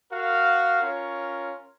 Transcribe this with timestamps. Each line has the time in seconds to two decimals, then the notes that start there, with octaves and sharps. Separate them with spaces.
0.11 F#4 A#4 F5
0.81 C#4 F4 A#4 C#5